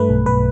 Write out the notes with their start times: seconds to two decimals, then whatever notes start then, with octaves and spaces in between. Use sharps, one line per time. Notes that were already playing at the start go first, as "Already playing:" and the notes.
Already playing: G2 A3 B4
0.09 B1
0.26 B1 B4